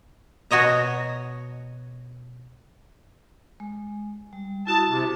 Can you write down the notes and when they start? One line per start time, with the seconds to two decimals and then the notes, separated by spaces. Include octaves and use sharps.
0.51 B2 F#4 C#5 D#5 A#5
3.60 G#3
4.33 G3
4.67 E4 F#4 A5 D#6
4.89 C3